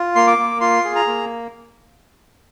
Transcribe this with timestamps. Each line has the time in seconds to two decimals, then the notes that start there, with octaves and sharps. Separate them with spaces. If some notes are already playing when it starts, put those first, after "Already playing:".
Already playing: F4
0.15 A#3 C6
0.27 D6
0.38 A#3
0.61 F4 C6
0.85 G#4
0.95 A#5
1.07 A#3